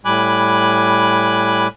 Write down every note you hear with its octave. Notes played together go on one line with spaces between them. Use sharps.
A2 G3 G#5 B5 D6 F#6